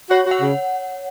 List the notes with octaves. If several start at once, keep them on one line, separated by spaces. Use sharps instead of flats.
F#4 C#5
F#4
F#5
C#3